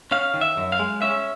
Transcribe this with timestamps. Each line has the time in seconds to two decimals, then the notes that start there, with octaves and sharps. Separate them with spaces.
0.11 C#4 F5
0.34 D#3
0.41 E5
0.57 F#2
0.72 F5
0.79 G#3
1.02 C#4 E5